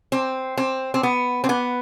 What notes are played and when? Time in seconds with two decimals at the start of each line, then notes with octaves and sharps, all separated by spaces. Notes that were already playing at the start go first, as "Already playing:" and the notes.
0.12 C4
0.58 C4
0.94 C4
1.03 B3
1.44 C4
1.49 B3